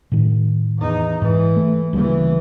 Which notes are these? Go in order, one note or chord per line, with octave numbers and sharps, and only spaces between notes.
A2 D#3
E2 D#4
G#2 E3
A3
D2 C#3 E3 G3 A#3